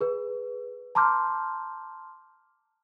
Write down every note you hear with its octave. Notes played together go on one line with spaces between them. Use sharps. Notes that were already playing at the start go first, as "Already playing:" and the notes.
G#4 B4
A5 A#5 C6 D6 F6 G6